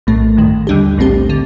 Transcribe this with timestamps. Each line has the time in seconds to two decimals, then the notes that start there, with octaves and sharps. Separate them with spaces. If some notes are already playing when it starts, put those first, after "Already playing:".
0.07 A#1 A2 A3
0.37 A1 G2 D#3
0.67 D#2 D3 G3 D4 G4
0.98 A#1 A2 A3 C4 G4
1.29 D3 A3